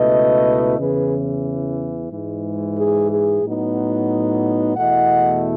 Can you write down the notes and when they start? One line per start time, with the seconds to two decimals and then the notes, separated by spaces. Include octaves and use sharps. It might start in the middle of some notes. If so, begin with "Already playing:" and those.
Already playing: C#2 B2 A3 E4 B4 D#5
0.78 E2 C#3 E3 G#4 B4
2.11 G#2 E3 G#3
2.77 G#4
3.10 G#4
3.44 A2 F#3 B3 D#4
4.76 E2 B2 A3 E4 D#5 F#5